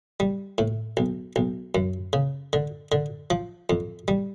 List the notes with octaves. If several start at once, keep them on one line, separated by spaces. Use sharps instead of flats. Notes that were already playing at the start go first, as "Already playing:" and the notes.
G3
A2
B1
B1
F#2
C#3
D3
D3
F3
F2
G3